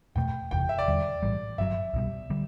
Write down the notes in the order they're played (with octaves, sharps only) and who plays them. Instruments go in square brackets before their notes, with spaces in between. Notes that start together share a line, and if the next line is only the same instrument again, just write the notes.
[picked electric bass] E2 B2 A3 [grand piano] G5
[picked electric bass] F#1 E2 C3 E3 [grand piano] G5
[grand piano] E5
D5
[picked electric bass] E2 D3 G3
B1 A2 E3 G3
[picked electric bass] G1 F#2 D3 F#3 [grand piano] E5
[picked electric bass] C2 B2 G3
D3 G3